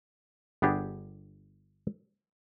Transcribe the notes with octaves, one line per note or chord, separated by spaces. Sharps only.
G1 B3 D4 G4 G#4